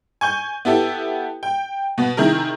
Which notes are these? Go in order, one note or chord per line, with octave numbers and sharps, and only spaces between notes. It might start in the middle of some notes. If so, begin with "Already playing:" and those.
G#5 C#6 G6
B3 E4 G4 A4
G5
B2 B3
C3 D#3 E4 G#4 A#4